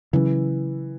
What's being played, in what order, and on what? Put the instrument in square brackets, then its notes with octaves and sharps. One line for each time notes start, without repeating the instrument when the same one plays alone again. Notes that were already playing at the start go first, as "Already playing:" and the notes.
[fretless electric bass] C#3 F#3 C#4 [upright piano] E3